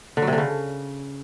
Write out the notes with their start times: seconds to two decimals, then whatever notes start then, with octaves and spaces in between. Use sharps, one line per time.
0.17 D3
0.22 F#3
0.27 C3
0.33 D3
0.38 C#3